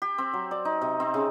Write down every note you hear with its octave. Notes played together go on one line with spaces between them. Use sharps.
G4
C4
F#3
D5
D#4
C3
C4
C#3